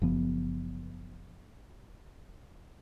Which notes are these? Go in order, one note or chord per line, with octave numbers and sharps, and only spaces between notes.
F#1 F3 B3